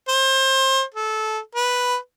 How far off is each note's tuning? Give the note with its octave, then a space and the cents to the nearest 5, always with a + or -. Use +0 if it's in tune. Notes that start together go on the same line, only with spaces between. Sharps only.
C5 +30
A4 -20
B4 +0